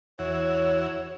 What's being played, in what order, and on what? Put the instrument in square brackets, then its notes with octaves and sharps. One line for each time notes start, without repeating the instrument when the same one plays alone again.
[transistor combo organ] E2 E4 F#4 [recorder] C#5